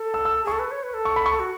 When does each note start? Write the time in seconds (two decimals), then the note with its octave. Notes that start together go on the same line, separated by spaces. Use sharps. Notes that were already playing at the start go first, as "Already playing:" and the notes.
Already playing: A4
0.14 E6
0.25 E6
0.44 G#4
0.47 A4 C#6
0.59 B4
0.71 C#5
0.83 B4
0.94 A4
1.05 C#6
1.16 B5
1.26 C#6
1.39 F#4